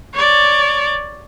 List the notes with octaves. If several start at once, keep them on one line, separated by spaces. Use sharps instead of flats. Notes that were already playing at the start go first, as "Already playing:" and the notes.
C#5 D5